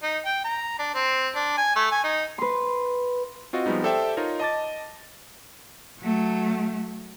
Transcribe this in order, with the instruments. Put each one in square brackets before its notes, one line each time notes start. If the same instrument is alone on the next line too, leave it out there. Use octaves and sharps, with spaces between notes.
[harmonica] D#4
G5
A#5
D4
C4
D4
G#5
A3
G#5
D#4
[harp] B4 C6
[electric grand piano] C4 F4 F#4 D#5
F3 G3 G#3 B3 D#4
G4 A4 C5 D5 E5 G5
D#4 F4 A#4 C#5
D#5 A5 D6 A6
[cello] F#3 A3